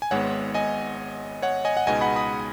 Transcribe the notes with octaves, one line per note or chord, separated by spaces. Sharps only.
G#5
G#1 G#2 G#3 B3 C#5 F#5
D#5 G#5
C#5 F#5
D#5 G#5
F#5
C#2 B2 G#3 B3 D#4 D#5 G#5
F#5 B5
B5 D#6